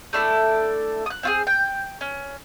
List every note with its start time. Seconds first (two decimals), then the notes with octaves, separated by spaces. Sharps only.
0.13 A3 D4 E4 A4
1.06 D#6 F#6
1.23 C4 F4 G#4
1.47 G5
2.01 C#4